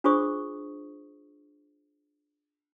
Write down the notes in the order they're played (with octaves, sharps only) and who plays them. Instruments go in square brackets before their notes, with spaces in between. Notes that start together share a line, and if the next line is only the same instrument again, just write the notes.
[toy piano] D4 F4 G#4 C5 C#6 D#6